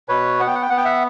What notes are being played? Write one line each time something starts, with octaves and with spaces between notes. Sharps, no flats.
B2 B4 C#5
B3 F#5
G5
F#5
G5
B3 F#5
G5
E5 F#5